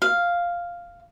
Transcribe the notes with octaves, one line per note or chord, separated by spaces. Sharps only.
F5